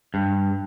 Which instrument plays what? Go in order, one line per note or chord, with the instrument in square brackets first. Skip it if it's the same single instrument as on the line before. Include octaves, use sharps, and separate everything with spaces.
[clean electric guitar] G2